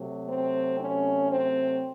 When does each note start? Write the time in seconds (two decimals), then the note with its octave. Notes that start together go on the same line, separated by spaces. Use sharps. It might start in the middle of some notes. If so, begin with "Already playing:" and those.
Already playing: C3 F#3 A3
0.28 C4
0.80 C#4
1.32 C4